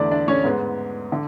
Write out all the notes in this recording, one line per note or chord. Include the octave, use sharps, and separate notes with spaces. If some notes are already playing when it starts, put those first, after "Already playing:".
Already playing: E2 D3 A3 D4 D5
D4 D5
C#4 C#5
G#2 G#3 B3
D3